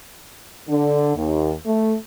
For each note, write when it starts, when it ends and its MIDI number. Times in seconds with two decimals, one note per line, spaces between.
0.69 1.15 50
1.15 1.53 39
1.66 1.95 57